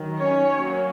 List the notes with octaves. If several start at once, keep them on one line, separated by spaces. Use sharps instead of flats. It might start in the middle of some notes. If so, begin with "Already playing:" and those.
Already playing: D#3 F#3
C#4 C#5
F#3 A#3 C#4